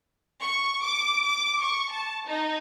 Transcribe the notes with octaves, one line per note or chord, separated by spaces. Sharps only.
C#6
D6
D6
C#6
A5
D#4